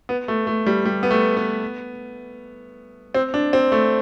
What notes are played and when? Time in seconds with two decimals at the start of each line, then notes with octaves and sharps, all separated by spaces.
0.09 B3
0.28 A3
0.47 A3
0.66 G3
0.85 G3
1.03 B3
1.11 A3
1.37 B3
3.15 C4
3.34 D4
3.53 C4
3.72 A3